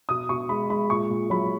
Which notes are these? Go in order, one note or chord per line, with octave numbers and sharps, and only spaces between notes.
B2 D#6
B2 C#6
G#3 B5
G#3 B5
A#2 C#6
A#2
F#3 B5